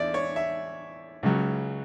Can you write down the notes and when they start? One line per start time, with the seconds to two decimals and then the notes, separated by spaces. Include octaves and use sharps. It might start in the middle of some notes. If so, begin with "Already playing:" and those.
Already playing: E2 D3 D5 E5
0.14 C#5
0.36 E5
1.23 C#2 C#3 F#3